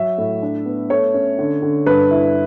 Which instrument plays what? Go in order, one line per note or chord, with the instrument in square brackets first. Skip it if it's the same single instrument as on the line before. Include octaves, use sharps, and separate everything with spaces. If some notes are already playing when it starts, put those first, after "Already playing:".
Already playing: [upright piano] F#3 E5
A2
D4
B3
A3 C#5
C#4
D3
D3
G2 B4
E4